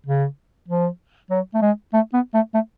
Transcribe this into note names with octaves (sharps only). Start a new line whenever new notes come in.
C#3
F3
F#3
A3
G#3
A3
B3
A3
A3